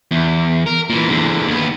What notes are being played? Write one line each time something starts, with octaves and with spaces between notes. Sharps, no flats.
E2
A#4
A#2 E3
E2 D3
D#2 B3